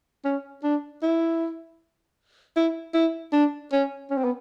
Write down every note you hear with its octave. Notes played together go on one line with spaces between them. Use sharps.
C#4
D4
E4
E4
E4
D4
C#4
C#4
C4
B3